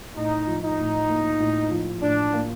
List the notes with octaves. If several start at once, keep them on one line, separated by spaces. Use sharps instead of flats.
A2 D#4
F3
D#4
A2
A#3
A2
F3
A2 D4
A#3